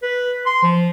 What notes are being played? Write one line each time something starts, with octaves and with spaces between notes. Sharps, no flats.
B4
C6
F3